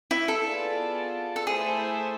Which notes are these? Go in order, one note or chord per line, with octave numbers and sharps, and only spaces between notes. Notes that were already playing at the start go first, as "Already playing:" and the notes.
E4
A4
B3 F4 G#4 D5 A5
A4
A3 E4 G#4 A4 C5 E5